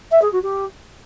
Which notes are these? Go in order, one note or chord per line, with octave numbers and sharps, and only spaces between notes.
E5
G#4
F#4
G4